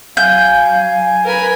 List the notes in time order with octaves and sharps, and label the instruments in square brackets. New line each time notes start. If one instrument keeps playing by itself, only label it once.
[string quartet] F#3 [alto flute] F5 [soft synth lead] G#5 [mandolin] G6
[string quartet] A#4 G#5 B5 [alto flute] B4